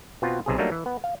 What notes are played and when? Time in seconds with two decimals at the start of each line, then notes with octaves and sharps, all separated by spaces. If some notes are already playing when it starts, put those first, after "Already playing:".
0.22 B2 B3 C4 F4
0.46 B1 C3 G#4
0.58 F#3 G3 A3 A#3 D4 D#4
0.72 E3
0.86 B3
1.04 F5